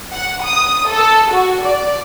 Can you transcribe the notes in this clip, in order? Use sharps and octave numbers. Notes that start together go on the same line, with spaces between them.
F#5
D#6
A4
F#4
D5